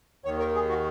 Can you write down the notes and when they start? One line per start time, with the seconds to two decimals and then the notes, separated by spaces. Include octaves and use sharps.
0.25 D#2 D#3 C#5
0.39 A#4
0.55 G#4
0.69 F#4